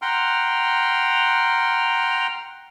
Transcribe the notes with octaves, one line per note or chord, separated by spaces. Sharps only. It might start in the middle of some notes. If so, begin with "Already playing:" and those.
F#5 G5 A#5 C6 F6